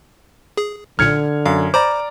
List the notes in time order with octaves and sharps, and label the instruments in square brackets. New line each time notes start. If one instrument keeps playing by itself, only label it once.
[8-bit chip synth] G#4
[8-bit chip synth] B1 A#2 [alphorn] D3 [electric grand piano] F6 G#6 C#7
[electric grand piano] F#2 [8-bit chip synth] F5
[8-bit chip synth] C5 B5 [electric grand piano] D5 A#5 D6